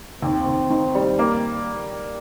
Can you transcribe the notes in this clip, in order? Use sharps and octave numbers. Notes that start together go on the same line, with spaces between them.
D#2 C4
D#2
D#3
G3
A#3